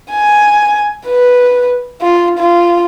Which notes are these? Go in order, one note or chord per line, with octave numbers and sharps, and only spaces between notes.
G#5
B4
F4
F4